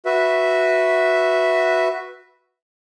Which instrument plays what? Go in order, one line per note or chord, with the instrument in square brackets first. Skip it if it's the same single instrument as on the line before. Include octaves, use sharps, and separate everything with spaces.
[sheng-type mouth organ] F#4 B4 E5